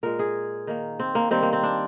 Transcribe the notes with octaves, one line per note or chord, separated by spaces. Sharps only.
A#2 G#3 A#4
G#4
D#3 A#3
C4
A#3
D#3 G3 A#3 C4
A#3
C4
D4